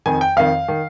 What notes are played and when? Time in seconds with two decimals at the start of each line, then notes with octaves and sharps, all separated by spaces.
0.06 F2 D#3 G#5
0.21 G5
0.36 F2 D#3 F5
0.68 D#3